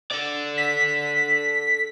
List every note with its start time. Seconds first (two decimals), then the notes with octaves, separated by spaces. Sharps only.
0.11 A4 D5
0.58 B6